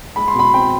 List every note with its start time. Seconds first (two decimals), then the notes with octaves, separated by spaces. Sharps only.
0.16 G#3 B5
0.28 C6
0.35 B2 B5
0.54 C4 G5